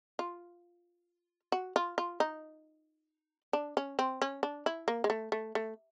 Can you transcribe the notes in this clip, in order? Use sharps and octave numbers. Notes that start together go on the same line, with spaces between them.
F4
F#4
F4
F4
D#4
D4
C#4
C4
C#4
D4
E4
A#3
G#3
A3
A3
A3